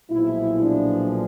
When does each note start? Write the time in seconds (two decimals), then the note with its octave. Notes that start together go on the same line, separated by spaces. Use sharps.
0.11 B1 A#2 F3 G#3 E4
0.60 D4